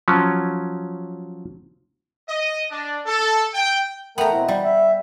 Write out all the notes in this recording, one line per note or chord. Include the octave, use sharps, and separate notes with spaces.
F3 F#3 C#4
D#5
D4
A4
G5
A3 B3 A#4 G5 A#5
B2 C4 E4
G3
E5